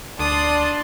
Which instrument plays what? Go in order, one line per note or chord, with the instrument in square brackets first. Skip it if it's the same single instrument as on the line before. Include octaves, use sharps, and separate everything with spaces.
[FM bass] D2 [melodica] D4 [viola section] D5 A5 C6 [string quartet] D#6